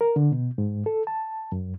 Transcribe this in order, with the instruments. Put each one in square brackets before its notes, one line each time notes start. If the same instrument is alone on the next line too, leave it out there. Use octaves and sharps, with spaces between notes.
[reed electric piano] A#4
D3
B2
G#2
A4
A5
F#2